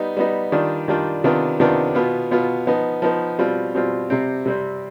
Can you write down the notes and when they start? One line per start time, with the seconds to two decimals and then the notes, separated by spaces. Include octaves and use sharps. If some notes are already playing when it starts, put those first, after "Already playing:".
Already playing: G3 B3 D#4
0.17 G3 B3 D#4
0.52 D#3 G3 D4 F4
0.88 D#3 G3 D4 F4
1.24 C3 D#3 B3 D4 F4
1.60 C3 D#3 B3 D4 F4
1.95 B2 B3 F4
2.31 B2 B3 F4
2.67 F3 B3 D#4
3.02 F3 B3 D#4
3.38 B2 G3 C4 F4
3.75 B2 G3 C4 F4
4.10 C3 G3 C4
4.46 C3 G3 C4